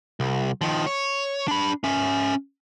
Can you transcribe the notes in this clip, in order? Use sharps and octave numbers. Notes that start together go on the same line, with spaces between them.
C2
D#3 F3
C#5
D4 B5
C#4 E5